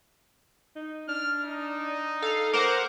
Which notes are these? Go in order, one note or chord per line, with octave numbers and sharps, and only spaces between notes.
D#4
D4 F6
D#4
A4 F5
A3 A#4 C5 F#5 D6